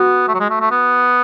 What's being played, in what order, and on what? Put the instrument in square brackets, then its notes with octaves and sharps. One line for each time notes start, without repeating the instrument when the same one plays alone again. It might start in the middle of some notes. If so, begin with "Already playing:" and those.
Already playing: [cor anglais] B3 [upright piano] F#4
[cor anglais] A3
F#3
G#3
A3
A3
B3